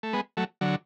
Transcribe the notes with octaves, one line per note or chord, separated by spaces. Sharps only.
A3
G#3 B3
F#3 A3
D3 F#3